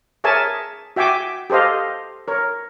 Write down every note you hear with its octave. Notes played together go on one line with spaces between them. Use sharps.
G#4 A#4 C#5 E5 G#5 A5
F#4 E5 G5 G#5 D6
G4 A4 C5 D#5 F5
A#4 C#5